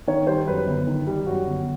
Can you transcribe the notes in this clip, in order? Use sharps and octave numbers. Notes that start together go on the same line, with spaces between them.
D#3 C#5
G3 C5
F#2 B4
G1
D#3
G3
F#2 F#4
G1